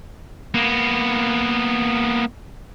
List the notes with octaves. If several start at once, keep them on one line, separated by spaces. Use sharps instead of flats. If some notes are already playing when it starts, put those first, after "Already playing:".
A#3 B3